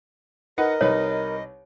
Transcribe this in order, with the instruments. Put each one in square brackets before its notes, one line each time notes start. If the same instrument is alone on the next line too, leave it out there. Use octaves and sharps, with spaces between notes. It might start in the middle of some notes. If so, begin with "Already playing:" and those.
[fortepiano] D#4 B4 F#5 [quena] A#4 [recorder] D#5
[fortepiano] C2 D#4 B4 [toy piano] C#5